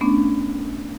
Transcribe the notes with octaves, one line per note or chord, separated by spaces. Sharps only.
A3 B3 C#4 D4